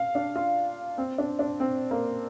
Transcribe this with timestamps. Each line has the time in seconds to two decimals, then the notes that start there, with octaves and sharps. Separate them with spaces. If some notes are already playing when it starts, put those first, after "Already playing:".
Already playing: F5
0.15 D4
0.36 F4
0.98 C4
1.18 D4
1.39 D4
1.60 C4
1.91 A#3